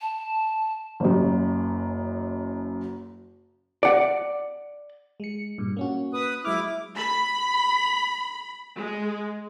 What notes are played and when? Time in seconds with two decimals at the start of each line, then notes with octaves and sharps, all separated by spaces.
0.01 A5
1.00 F#1 F#2
3.83 D5 F#5
5.20 G#3 C#7
5.58 G2 A#2
5.77 A#3 C#4 F#4
6.13 B4 D#6
6.45 F#3 G#3 E4 D6 F6
6.95 B5
8.76 G#3